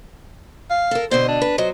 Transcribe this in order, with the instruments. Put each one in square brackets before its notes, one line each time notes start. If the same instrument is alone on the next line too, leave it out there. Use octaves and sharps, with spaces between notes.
[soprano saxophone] F5
[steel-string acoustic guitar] A4 A#4
[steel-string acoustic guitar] B2 D3 D#5 [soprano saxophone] C5
[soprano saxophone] D4
[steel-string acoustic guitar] B4
[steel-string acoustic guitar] F#3 C5 [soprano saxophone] D#5